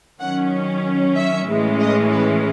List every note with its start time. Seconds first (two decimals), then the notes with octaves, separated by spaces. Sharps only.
0.20 D#3 F#3 C#4 F#5
1.16 E5
1.48 A2 E3 G#3 C#4
1.80 D#5
2.12 B4